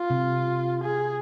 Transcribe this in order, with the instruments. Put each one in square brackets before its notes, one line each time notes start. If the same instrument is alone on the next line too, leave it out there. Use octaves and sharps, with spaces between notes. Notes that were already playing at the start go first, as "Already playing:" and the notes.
Already playing: [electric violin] F4
[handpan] C3
[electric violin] G#4